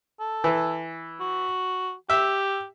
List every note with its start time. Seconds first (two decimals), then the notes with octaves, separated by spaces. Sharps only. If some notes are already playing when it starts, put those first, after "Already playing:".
0.20 A4
0.44 E3
1.20 F#4
2.10 G4 E5